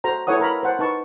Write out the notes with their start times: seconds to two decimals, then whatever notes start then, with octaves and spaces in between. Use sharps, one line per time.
0.04 F#4 A4 C5 A#5
0.27 E4 A4 B4 C#5 F#5 D#6
0.40 A#4 A#5 B5
0.63 C5 F#5 A5
0.79 D#4 B4 A5 C#6